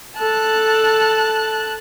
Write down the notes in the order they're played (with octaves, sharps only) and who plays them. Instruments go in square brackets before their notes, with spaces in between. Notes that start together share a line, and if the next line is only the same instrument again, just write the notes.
[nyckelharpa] A4 [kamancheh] A5 F#6